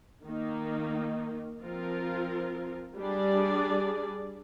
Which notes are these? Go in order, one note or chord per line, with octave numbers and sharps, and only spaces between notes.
D#3 A#3 D#4
F3 C4 F4 A#4
G3 D4 G#4 D5